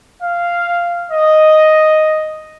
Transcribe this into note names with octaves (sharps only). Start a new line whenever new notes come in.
F5
D#5